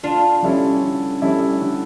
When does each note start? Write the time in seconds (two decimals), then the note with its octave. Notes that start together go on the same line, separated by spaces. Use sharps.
0.03 D3 D4 F4
0.43 G3 C#4 E4 A4
0.83 D3
1.22 G3 C#4 E4 A4
1.62 D3